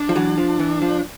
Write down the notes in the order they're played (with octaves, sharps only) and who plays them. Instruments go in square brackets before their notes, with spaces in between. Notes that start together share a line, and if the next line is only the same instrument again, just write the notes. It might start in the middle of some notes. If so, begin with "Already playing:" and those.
Already playing: [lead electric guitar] D4
[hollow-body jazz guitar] F3
E3 F#3
F3
E3
F3